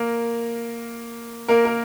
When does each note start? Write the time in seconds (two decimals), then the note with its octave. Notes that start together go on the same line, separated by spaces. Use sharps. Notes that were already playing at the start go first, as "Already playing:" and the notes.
Already playing: A#3 A#4
1.48 A#3 A#4
1.65 A#4